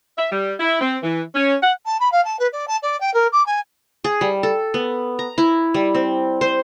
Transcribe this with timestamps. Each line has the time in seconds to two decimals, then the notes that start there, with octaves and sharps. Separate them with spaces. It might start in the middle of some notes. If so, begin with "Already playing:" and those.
0.18 E5
0.32 G3
0.60 E4
0.81 C4
1.03 E3
1.35 C#4
1.62 F#5
1.85 A5
2.00 B5
2.12 F5
2.24 A5
2.39 B4
2.52 D5
2.68 A5
2.82 D5
3.00 G5
3.13 A#4
3.32 D6
3.46 G#5
4.04 G#4
4.21 G3
4.43 A4
4.74 B3
5.19 A#5
5.38 E4
5.74 G3
5.95 C4
6.41 C5